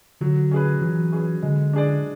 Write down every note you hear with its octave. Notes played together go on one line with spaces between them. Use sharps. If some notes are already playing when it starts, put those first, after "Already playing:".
D3 F#3
C#4 G#4 B4
E3 F#3
C#4 G#4 B4
D3 G#3
D4 G#4 D5